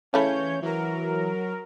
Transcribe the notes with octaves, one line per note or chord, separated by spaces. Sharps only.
C#3 E3 A3 C#4 C#5 B5 G6
E3 F#3 A#4